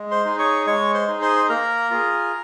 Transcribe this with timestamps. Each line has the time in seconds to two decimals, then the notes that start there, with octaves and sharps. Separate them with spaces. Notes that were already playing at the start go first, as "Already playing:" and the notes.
Already playing: G#3
0.11 C5 C6
0.25 D#4 G#4
0.39 C#5 C#6
0.67 G#3 C#5 C#6
0.94 C5 C6
1.08 D#4 G#4
1.22 C5 C6
1.49 A#3 A#4 A#5
1.91 F4 G#4